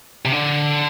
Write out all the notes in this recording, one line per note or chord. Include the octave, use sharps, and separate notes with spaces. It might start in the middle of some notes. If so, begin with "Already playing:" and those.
C3
D3